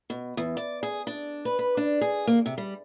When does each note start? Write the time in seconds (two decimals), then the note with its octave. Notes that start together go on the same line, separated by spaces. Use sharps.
0.10 B2
0.37 E2
0.57 D5
0.83 G#4
1.07 D4
1.45 B4
1.59 B4
1.77 D4
2.01 G#4
2.27 A#3
2.46 C3
2.58 G3